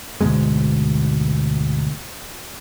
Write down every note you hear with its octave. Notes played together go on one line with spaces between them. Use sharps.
D2 G#2 B2 G#3